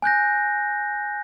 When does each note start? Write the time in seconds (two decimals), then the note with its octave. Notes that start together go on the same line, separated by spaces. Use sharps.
0.02 G#5 F#6 G6 A#6